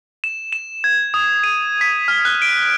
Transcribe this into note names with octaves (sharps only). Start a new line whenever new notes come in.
E7
E7
G#6
D#6
D#7
B6
F6
F#6
D7